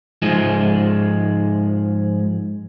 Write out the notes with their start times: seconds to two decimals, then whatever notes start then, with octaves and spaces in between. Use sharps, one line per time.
0.22 G#2 F3 G#3